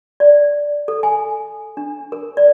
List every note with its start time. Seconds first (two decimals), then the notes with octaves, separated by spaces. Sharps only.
0.20 D5
0.88 A4
1.03 G#5
1.77 D4
2.12 A#4
2.37 D5